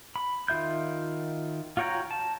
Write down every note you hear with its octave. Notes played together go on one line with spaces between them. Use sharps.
B5
D#3 F4 E5 G6
F4 F#4 C#5 G5 A#5
A5